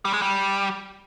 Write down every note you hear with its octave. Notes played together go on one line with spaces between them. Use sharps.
G3
G#3
G3